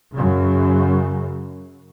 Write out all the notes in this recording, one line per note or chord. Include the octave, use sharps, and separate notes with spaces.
F#2 C#3